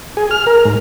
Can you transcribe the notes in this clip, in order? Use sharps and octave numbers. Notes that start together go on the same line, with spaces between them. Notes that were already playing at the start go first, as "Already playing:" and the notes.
G#4
F6
A#4
G#2